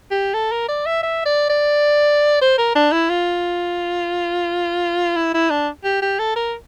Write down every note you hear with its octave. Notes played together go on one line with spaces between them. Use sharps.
G4
A4
A#4
D5
E5
E5
D5
D5
C5
A#4
D4
E4
F4
E4
E4
D4
G4
G4
A4
A#4